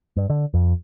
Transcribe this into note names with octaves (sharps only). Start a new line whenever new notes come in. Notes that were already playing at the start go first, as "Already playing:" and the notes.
G2
D3
F2